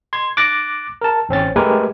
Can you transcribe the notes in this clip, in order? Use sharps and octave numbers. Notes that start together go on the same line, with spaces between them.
C6 G#6
D6 F#6 A6 A#6
A#4 A5
A1 C4 C#4 A6
G#3 A3 G4 A#4 B4 G#5